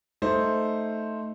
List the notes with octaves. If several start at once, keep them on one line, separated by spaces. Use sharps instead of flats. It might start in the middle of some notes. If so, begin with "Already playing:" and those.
A3 D#4 C5